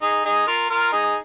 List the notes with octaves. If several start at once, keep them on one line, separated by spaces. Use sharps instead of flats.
D#4 G#4
D#4 G#4
F4 A#4
F4 A#4
D#4 G#4